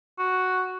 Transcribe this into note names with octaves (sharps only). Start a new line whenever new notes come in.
F#4